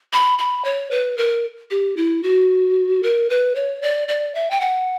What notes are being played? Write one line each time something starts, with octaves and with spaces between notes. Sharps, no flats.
B5
B5
C#5
B4
A#4
G4
E4
F#4
A#4
B4
C#5
D5
D5
E5
G5
F#5